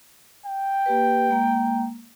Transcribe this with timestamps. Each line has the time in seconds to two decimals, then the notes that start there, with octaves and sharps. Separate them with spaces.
0.45 G5
0.86 A#3 G4 B4
1.28 G#3 A#3 A#5